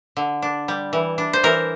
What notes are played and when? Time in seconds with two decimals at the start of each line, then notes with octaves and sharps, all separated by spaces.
0.17 D3
0.42 D4
0.68 G3
0.93 E3
1.18 D4
1.33 C5
1.44 E3 A#4